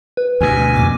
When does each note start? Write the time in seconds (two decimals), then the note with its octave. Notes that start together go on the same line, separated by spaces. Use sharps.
0.17 B4
0.41 D2 B2 G#5
0.76 F2 A#2 D6